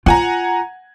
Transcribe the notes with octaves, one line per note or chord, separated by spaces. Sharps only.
F4 F#5 G#5 A#5